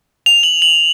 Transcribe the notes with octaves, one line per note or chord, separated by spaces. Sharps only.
F7
F#7
F#7